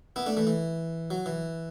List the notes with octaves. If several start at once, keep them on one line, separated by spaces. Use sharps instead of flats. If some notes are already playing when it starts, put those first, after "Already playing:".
B3 E4
A3 D4
E3 A3
E3
F#3
E3